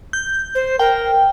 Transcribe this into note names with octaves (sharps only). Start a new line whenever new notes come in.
G6
C5
A#4 G5